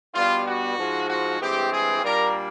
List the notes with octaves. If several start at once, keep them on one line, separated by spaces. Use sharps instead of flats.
B2 G3 B3 D4 F4
F#4
G#2 F3 G#3
F#4
G2 E3 G#3 C4 G4
G#4
A#2 G3 A#3 D4 A#4